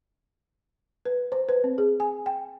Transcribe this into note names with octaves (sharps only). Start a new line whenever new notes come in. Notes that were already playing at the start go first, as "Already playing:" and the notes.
B4
C5
B4
C4
G#4
G#5
G5